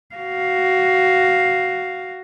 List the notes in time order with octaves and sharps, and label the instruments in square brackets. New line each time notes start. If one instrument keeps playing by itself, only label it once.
[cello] F#4 F5